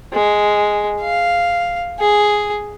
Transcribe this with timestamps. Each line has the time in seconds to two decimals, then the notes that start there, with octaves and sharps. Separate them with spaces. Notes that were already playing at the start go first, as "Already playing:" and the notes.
0.13 G#3
1.01 F5
2.00 G#4